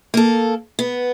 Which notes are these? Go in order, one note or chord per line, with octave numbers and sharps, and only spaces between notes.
A#3 A4
B3